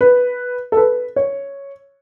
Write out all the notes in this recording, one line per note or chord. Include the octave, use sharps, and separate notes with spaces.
B4
A4
B4
C#5